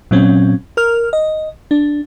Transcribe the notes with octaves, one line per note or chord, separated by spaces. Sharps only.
A#2 F#3 C4 C#4
A#4 F6
D#5
D4